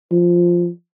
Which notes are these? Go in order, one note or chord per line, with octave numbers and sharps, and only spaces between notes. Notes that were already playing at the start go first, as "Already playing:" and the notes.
F3